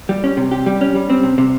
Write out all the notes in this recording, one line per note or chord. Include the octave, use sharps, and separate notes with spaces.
G3
C#4
C3
G4
G3
C#4
G3
C4
C3
C3